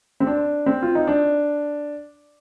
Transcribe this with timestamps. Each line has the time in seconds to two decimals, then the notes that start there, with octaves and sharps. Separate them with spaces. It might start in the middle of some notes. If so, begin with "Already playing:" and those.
0.20 C4
0.27 D4
0.66 C4
0.82 F4
0.95 D#4
1.07 D4